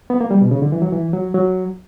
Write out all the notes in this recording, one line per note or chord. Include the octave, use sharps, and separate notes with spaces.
B3
A#3
G3
B2
C#3
D3
E3
F#3
E3
F#3
F#3